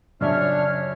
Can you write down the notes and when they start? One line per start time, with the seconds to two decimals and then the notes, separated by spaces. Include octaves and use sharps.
0.21 F#2 C#3 F3 D4 C#5 D#5 E5 F6